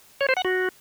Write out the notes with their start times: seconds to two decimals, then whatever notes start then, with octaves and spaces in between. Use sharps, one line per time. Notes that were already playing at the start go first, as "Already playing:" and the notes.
0.21 C#5
0.29 C5
0.37 F#5
0.45 F#4